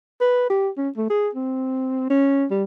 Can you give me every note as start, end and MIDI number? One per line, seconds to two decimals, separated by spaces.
0.21 0.49 71
0.50 0.69 67
0.77 0.89 61
0.97 1.09 57
1.10 1.29 68
1.35 2.06 60
2.10 2.45 61
2.51 2.64 55